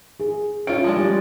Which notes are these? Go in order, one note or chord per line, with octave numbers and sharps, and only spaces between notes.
G#4
C#4 F4 D7
F3 G#3 D4
G3